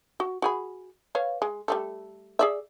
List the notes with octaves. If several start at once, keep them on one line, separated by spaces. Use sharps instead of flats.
F#4
F#4 G#4 B5
B4 C#5 F5
G#3
G3 A3 A4
G#4 D5 E5